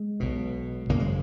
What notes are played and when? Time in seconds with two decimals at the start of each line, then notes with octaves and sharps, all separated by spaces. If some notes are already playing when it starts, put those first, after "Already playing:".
Already playing: G#3
0.20 B1 B2
0.89 G#1 F#2 C#3 A#3
1.00 G#3